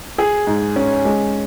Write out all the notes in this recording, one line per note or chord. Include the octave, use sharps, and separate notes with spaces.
G#4
G#2
C#4
G#3